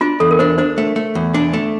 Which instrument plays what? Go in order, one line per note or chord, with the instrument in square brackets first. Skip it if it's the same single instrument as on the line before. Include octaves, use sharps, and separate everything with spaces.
[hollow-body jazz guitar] D4 [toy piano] F4
[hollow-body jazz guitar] E2 [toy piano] A4
[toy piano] A#4
[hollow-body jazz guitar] D4 [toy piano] C5
[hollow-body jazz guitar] D4 [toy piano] C5
[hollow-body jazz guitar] A3
A3
E2
D4
A3